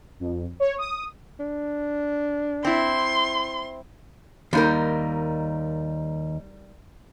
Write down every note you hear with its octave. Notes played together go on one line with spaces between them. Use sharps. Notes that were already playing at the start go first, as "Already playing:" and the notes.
F2
C#5
D#6
D4
C4 E4 C6
D#2 G3 D#4 A#4